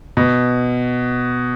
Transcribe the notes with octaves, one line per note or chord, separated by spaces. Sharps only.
B2